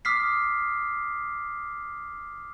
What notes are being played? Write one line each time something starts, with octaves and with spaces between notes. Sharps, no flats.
D6 D#6 F6 B6 C7